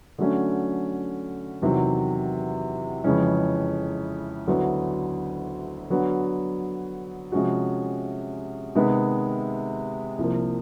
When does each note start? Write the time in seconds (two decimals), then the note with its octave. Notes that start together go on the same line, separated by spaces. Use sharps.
0.18 D3 F#3 A3 C#4
1.62 E2 C3 D#3 F#3
3.04 F2 C#3 E3 G#3 C#4
4.47 D2 D3 F#3 B3 E4
5.90 D3 F#3 B3
7.32 C3 F3 G#3 C#4 F#4
8.75 C3 D#3 G#3 B3
10.18 C2 C3 F3 A#3